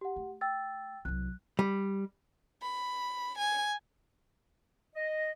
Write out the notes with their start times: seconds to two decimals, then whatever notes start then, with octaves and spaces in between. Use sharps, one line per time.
0.01 G4 F#5
0.16 A3
0.41 G5 E6 A6
1.05 C2 F#3 F#6
1.59 G3
2.62 B5
3.38 G#5
4.95 D#5